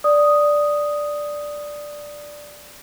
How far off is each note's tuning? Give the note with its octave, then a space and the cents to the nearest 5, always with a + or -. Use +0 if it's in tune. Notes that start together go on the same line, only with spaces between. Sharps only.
D5 +0 D#6 +0